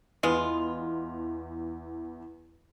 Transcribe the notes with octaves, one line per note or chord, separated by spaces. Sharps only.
E2 G#3 B3 F4